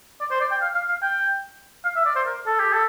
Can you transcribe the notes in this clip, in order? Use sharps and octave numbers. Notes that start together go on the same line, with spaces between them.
D5
C5
D5
G5
F5
F5
F5
G5
F5
E5
D5
C5
A#4
A4
G4
A4